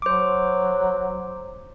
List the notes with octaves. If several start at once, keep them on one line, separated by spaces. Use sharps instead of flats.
F#3 C5 D6